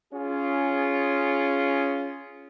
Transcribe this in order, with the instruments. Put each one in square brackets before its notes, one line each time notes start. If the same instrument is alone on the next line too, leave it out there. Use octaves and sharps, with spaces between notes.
[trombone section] C#4 F4 G#4